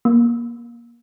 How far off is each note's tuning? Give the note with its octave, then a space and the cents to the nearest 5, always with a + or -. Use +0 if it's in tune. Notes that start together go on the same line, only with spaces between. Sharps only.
A#3 +20